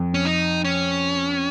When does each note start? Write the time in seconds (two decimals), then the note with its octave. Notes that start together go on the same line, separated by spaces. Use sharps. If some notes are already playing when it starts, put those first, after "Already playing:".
Already playing: F2
0.14 C#4
0.25 D#4
0.64 C#4